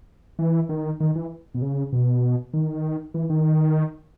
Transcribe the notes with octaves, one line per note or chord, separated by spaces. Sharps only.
E3
D#3
D#3
E3
B2
C#3
B2
D#3
E3
D#3